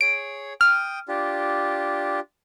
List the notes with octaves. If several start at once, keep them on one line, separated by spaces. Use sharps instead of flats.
G#4 C#5 D7
G5 D#6 F6
D4 F4 G4